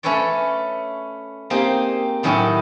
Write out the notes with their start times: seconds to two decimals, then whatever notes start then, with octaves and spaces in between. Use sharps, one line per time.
0.03 A3 C#4 A4 B4 C#5 D5
1.50 A#3 C4 D#4 G4 G#4
2.23 A2 D#3 F#3 C#4 E4 G4